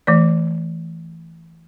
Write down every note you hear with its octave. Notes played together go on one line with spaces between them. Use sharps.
E3 A3 D5